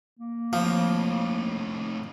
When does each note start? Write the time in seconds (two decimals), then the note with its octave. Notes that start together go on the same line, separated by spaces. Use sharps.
0.19 A#3
0.53 F2 A2 F3